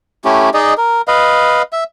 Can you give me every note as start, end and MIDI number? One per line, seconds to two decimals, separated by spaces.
0.25 0.50 57
0.25 0.50 61
0.25 0.50 64
0.25 0.50 67
0.54 0.74 63
0.54 0.74 68
0.54 0.74 74
0.54 0.74 75
0.78 1.02 70
1.08 1.62 71
1.08 1.62 75
1.08 1.62 77
1.73 1.84 76